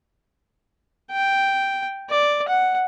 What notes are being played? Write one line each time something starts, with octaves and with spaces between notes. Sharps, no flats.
G5
D5
F#5